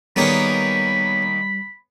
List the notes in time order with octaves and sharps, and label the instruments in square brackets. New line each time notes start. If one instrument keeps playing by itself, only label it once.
[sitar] D#3 A#3 [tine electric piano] G3 [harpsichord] B3 G#4 C#5 [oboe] B5